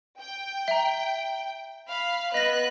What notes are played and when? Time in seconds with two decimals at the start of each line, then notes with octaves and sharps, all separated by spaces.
0.20 G5
0.68 E5 A#5
1.88 F5 B5
2.34 B3 B4 D#5 F#6 A#6